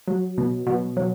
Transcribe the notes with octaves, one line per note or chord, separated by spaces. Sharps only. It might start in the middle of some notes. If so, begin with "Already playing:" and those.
F#3
B2
B2
F#3